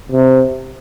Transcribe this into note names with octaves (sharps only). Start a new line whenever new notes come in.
C3